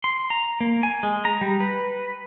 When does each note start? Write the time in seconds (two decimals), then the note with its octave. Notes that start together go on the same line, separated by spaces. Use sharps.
0.04 C6
0.30 A#5
0.61 A#3
0.83 G#5
1.03 G#3
1.25 A#5
1.41 G3
1.60 B4